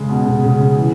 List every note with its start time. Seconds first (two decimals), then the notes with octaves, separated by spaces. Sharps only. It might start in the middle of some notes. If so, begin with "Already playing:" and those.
Already playing: C#3 G#3
0.10 B2
0.26 C#3
0.43 C#3
0.59 C#3
0.77 E3